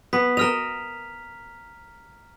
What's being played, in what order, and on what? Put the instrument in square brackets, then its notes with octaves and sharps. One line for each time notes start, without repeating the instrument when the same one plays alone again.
[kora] B3 [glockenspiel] B6
[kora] A#4 D#5 [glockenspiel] A#5 F6 F7